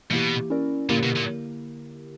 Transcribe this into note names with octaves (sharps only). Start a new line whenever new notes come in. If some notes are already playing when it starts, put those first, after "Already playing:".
B2 E3 A#3 E4 G4
C#4 E4 A#4 D5
A#2 D3 A#3 E4 G4 A#4
B2
A#2